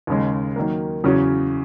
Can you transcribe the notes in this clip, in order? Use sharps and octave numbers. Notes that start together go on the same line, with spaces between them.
D#2 C#3 G#3
D#3 F#3 A#3
E2 C#3 F#3 C#4 F#4